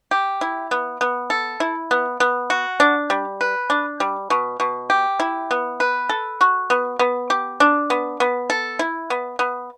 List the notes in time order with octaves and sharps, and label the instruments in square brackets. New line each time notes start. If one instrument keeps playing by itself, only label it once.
[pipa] G4
E4
B3
B3
A4
E4
B3
B3
F#4
D4
G3
B4
D4
G3
B2
B2
G4
E4
B3
B4
A4
F#4
B3
B3
G4
D4
B3
B3
A4
E4
B3
B3